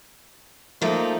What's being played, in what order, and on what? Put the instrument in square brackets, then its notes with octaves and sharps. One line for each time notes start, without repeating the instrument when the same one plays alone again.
[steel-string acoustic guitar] F3 A3 [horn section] A#3 D#4